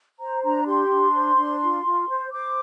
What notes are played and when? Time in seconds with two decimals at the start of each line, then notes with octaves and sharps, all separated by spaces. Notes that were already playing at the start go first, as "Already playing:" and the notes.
0.19 C5 A#5
0.43 D4 A#5
0.66 G4 C6
0.91 D4
1.14 C5
1.38 D4
1.62 F4
1.85 F4
2.09 C5
2.32 C5 D6